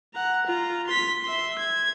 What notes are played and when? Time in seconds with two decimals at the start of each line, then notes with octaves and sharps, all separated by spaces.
0.14 F#5 A#5
0.46 F4 A#5
0.87 C6 B6
1.23 E5 C6
1.58 G#6